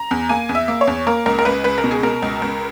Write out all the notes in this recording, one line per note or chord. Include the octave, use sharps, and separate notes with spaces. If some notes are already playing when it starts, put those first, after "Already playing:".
Already playing: A#5
E2
A#3 G#5
E2
E5
A#3
C#5
E2
A#3 A#4
C#2 A#4
A#4
C#2 B4
C#2 B4
A#4
B2
G#4
B2 A#4
C#2
C#2